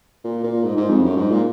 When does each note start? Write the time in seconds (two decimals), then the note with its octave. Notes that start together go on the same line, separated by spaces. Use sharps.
0.24 A#2
0.44 A#2
0.64 G#2
0.77 G#2
0.90 F2
1.03 F#2
1.16 G#2
1.30 A#2